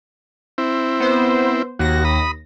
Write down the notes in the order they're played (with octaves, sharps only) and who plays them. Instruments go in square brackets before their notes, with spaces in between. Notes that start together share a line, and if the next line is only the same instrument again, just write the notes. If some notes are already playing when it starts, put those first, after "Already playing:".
[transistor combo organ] C4 E4
[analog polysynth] B3 C5
[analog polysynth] D#2 A#6 [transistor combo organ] F#4
[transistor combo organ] B5 D#6